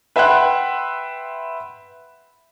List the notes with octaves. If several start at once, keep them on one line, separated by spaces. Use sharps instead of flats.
B4 E5 F#5 G5 C6 F#6